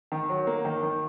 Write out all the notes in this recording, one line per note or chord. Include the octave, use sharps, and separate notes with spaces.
D#3
F#3
A#3
D#3
D#3